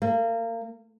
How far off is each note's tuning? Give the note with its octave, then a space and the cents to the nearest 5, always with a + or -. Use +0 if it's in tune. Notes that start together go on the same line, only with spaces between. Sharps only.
A#3 -30